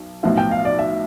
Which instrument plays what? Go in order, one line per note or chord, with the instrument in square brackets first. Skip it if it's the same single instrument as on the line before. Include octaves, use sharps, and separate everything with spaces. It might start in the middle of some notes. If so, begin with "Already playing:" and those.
Already playing: [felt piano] B1
[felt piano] B1 A2 F3 B3 F4 [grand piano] E5
[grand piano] G5
F5
D5
E5